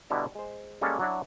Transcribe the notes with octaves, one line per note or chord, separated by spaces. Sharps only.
B2 D3 G3 E4 A4 A#5
G#3 C5
G3 G#3 A#3 C#4 A4
F#3 D4 E4 F#4